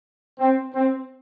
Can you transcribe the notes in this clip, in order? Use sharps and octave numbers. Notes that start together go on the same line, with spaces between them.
C4
C4